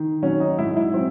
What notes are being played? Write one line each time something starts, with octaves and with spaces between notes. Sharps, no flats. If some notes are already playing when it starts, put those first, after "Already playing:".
Already playing: D#3
F#3 C#4
D#4
G#2 E4
E4
F#3 C4